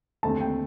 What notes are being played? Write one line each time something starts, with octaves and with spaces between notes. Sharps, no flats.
D#2 D3 A3 C4 A5
G5